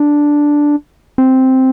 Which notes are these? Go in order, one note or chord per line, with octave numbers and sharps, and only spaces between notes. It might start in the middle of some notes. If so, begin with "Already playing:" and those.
Already playing: D4
C4